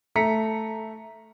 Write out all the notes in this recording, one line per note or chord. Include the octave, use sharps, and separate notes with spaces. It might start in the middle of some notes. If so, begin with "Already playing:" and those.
A3 A#5 B6 C#7